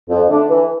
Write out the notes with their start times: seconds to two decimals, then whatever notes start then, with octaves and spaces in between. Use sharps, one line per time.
0.09 F2
0.29 D3 A3 D4
0.49 E3